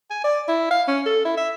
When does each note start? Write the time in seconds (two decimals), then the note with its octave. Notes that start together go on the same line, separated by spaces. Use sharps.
0.10 G#5
0.24 D5
0.48 E4
0.71 F5
0.88 C#4
1.06 A4
1.25 E4
1.37 E5